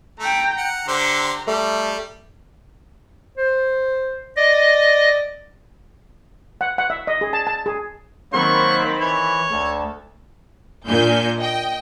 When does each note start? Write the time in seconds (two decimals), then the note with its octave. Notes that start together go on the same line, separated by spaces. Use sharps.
0.20 A3 G5 A#5
0.57 F#5 A#5
0.88 D3 G4 C5
1.47 G3 A3
3.38 C5
4.37 D5 D#5
6.61 F#5
6.78 F#5
6.90 E5
7.07 D#5
7.21 G#4
7.33 A5
7.47 A5
7.66 G#4
8.33 D#3 F#3 A#3 C4 C5 B5 C#6
9.00 E3 C#5
9.51 D2 A4
10.87 A#2 D4 G#5 G6
11.40 D#5 G5